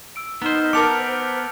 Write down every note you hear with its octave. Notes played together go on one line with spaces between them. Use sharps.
E6 D7
B3 D#4 C5 A#5 F6 G6
B3 A#4 A5 D6 C#7 F7
C5